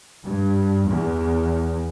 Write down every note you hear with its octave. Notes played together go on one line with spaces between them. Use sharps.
G2
E2